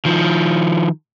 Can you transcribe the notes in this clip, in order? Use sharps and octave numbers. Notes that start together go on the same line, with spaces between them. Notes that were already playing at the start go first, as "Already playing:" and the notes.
D#3 F3